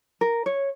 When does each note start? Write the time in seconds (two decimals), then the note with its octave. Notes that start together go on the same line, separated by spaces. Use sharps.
0.21 A#4
0.46 C#5